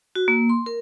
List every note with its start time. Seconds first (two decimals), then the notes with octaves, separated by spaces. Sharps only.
0.15 F#4
0.28 A#3
0.49 C6
0.66 A#4